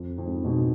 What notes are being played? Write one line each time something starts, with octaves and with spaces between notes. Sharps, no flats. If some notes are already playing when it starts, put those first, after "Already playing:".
Already playing: F2
F2
G#2
G#2 B2